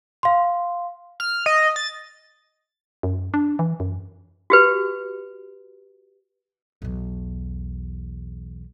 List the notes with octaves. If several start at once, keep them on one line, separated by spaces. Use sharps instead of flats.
F5 C6
F6
D#5
A6
F#2
D4
E3
F#2
F#4 G4 B4
B1 E2